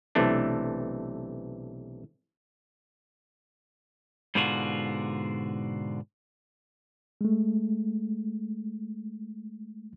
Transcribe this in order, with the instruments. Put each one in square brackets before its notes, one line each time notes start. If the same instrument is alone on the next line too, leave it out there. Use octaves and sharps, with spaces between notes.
[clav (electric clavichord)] B1 C3 E3 A3 D4
[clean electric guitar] G#2 B2 D3 D4 F4 F#4
[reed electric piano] G#3 A3